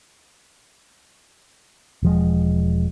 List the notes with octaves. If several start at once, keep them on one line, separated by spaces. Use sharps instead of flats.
E1 F3 G#3